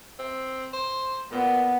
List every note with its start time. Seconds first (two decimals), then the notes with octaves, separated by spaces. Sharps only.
0.19 C4
0.73 C5
1.32 A#2 B3